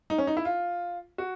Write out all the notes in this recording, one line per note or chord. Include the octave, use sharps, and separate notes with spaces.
D#4
C#4
D#4
E4
F4
F#4